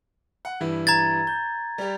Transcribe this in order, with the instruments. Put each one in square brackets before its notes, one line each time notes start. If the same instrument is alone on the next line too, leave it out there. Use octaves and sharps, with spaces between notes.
[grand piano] F#5
G2 E3 E4
[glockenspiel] A#5 G#6 A6
[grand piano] G6
G3 G4